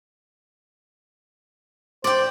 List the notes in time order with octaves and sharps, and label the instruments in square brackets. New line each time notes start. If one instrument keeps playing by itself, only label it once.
[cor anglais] C5 [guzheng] D5 G5